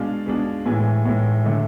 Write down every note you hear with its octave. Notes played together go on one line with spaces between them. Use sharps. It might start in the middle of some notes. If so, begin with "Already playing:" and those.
Already playing: B2 G#3 D4 F5
B2 G#3 D4
A2 E3 G#3 G#5
A2 E3 G#3
D3 A3